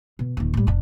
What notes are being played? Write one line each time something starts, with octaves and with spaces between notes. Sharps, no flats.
B2
D#1 D#3
A2 G3
F1 D4